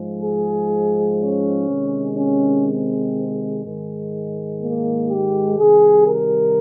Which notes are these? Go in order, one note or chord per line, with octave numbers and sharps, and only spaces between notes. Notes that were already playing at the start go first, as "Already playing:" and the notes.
Already playing: G#2 F3 G#3
G#4
C#4
C3 D#3 G#3
C#4
C4
G#2 D#3 G#3
A#3
G4
C3 D#3 G3 G#4
A#4